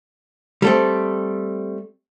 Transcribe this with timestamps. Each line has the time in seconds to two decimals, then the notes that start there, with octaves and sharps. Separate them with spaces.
0.62 G3 A3 C4